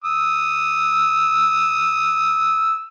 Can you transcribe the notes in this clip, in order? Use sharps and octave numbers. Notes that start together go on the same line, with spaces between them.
D#6 E6